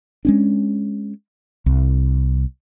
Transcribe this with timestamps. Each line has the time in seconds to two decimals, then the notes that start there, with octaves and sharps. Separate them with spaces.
0.25 G#3 C#4 D4
1.66 C2